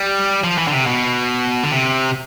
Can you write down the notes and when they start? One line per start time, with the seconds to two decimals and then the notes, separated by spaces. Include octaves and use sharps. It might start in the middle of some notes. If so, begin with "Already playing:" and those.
Already playing: G3
0.44 F3
0.58 E3
0.68 D3
0.72 C3
0.86 B2
1.63 D3
1.71 C3